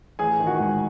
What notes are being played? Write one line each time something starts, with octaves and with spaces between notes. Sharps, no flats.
A1 G#4 G#5
D#3
F#4 F#5
G#2 G#5